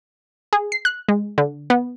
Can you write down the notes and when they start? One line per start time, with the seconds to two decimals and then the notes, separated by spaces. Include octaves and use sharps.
0.53 G#4
0.72 C7
0.85 F#6
1.08 G#3
1.38 D3
1.70 B3